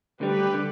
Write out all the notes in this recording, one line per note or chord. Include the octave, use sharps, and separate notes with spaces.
D2 D3 G3 G4 B4
D3